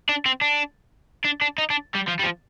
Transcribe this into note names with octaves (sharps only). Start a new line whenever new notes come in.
D4
C4
D4
D4
D4
D#4
D4
G3
F3
G3
F3